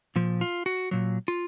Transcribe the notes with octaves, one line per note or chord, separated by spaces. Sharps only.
A#2 F3
F4
F#4
A#2 F#3
F4